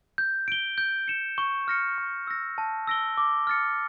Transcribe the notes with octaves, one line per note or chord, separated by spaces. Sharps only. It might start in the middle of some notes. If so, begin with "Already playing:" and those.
G6
D7 G7
G6
C#7 E7 G7
C#6
F6 A#6 C#7
C#6
E6 A#6
A5
E6 A#6 D7 G7
D6
F6 A6 C#7